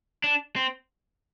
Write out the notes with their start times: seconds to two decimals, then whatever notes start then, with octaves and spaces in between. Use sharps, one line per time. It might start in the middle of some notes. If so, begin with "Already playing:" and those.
0.24 D4
0.56 C4